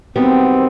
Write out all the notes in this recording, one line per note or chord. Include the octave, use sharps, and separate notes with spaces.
F#2 D#3 G3 B3 C4